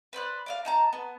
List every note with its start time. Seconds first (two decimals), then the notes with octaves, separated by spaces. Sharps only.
0.13 B4 C5 D5 F#6
0.46 D5 D#5 F5
0.65 D#4 A5 A#5
0.93 B3